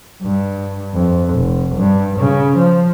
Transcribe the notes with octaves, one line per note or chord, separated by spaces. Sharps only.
G2
F2
F1
G2
C#3
F3